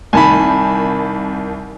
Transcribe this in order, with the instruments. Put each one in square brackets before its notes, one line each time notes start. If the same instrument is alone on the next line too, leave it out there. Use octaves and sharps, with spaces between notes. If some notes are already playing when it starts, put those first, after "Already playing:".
[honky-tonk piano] C2 D#3 [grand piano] G#5 A5 B5